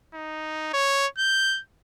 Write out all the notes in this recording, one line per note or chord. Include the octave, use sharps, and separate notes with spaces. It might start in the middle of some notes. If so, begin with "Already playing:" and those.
D#4
C#5
G6